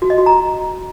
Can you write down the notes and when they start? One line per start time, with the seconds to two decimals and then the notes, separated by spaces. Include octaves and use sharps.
0.02 F#4
0.10 D#5
0.18 F#4
0.26 A#5